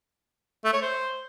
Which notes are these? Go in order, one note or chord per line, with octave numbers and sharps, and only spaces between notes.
A3
C#5
C5